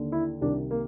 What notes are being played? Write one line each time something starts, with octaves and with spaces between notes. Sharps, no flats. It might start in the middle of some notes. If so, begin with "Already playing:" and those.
Already playing: D#2 D3
E4
C2 C3 D#3 D4
A#3